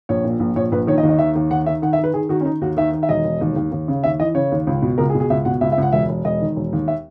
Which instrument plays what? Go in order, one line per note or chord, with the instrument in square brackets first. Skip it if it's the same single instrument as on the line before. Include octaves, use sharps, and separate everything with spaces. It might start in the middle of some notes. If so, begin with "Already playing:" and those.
[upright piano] A#1 C#5
A#2
A#1
A#1 C#5
A#1 B4
D#3 C#5
D#5
D#2
D#5
D#3 E5
D#2
D#3 F#5
D#3 E5
D#3 F#5
E5
D#3
B4
D#3 G#4
D#3 F#4
C#4
D#3 D#4
D#2 F#4
D#3 E5
D#3
E5
E1 D#5
E1
D#2
D#2
D#2
C#3
D#2 E5
E3 D#5
C#3 C#5
D#2
C#2
B2
C#2 A#4
G#4
B2
G#4
C#2 E5
B2 F#5
C#2 E5
E5
C#2 F#5
E1 E5
E1
E1 D#5
D#3
E1
D#2
E5